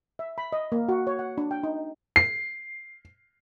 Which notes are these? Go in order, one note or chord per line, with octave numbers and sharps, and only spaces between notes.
E5
B5
D#5
A#3
F#4
C#5
F#5
D4
G5
D#4
C7